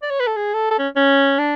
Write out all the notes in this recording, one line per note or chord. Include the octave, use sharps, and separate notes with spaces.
D5
C#5
B4
A4
G#4
A4
A4
C#4
C#4
D4